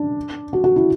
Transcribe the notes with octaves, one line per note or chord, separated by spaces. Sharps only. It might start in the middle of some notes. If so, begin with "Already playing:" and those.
Already playing: D4
F#4
F#4
E4